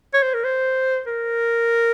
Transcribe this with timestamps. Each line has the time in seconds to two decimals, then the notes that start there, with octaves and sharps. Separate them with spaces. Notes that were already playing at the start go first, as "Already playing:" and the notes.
0.14 C#5
0.23 C5
0.34 A#4
0.44 C5
1.07 A#4